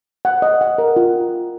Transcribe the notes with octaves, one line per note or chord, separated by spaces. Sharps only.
F#5
D#5
F#5
A#4
F4